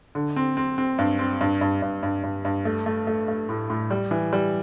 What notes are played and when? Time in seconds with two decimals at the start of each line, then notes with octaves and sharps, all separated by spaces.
0.15 D3
0.36 C4
0.57 C4
0.78 C4
0.98 G2
1.19 C4
1.41 G2
1.61 G2
1.82 G2
2.03 G2
2.23 G2
2.45 G2
2.65 A3
2.86 A3
3.07 A3
3.28 A3
3.49 A2
3.70 A2
3.90 G3
4.11 E3
4.33 G3